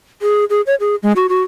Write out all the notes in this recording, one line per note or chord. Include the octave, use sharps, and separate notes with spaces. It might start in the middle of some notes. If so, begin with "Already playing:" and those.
G#4
G#4
C#5
G#4
G#3
F#4
F#4